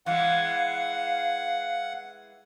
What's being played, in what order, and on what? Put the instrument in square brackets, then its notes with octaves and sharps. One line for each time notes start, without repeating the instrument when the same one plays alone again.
[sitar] E3 G#3 [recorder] F5 [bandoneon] F#5